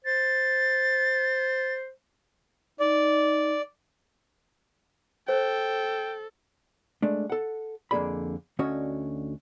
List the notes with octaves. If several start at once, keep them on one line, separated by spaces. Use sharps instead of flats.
C5 A6
D#4 D5
A4 C5 G5
G#3 A3 D4
A4 F#5
F2 D3 A#3 G#4 D5 B5
D2 D3 C#4 F#4 C#5 D#5